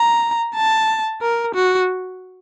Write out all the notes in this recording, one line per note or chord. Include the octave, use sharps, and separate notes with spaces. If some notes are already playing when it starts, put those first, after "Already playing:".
Already playing: A#5
A5
A#4
F#4